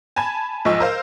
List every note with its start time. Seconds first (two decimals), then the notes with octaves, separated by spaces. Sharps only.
0.16 G#5 A5 B5 G#6
0.65 B1 G#2 F3 D#5 C#6 E6
0.80 A#4 C5 F5